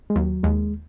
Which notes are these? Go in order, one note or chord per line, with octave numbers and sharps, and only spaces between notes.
G#3
D#2 F#3
D#2 G#3